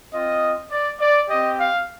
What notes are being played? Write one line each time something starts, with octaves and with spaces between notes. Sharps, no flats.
C4 F4 D#5
D5
D5
C4 G4 D#5
F5